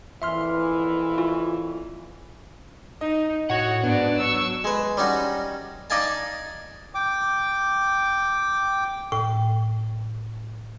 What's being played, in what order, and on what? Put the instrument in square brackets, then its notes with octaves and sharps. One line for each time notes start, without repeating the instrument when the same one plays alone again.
[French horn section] F2 A#2 E3 [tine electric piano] E5 C6 F6
[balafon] F4
[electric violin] D#4 [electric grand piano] D#5
[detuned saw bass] A2 [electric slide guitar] F#4 F#5 [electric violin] C#5
[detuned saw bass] G#2 [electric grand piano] B3 [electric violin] D4 D5
[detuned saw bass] F#3 [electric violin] C#6 E6
[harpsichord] G#3 B4
G3 C#4 D#4 F#4
D#4 D5 D#5 F5 G#5 A5
[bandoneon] G5 D6
[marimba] A2 G5